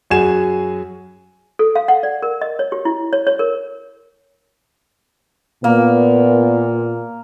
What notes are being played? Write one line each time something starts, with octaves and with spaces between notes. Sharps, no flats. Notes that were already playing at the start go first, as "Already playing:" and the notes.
F#2 F#4 G#4 G#5 G#6 E7
A4
F5
F#5
D5
A#4
D#5
C#5
G4
E4
C#5
C#5
A#4
A#2 A#3 B3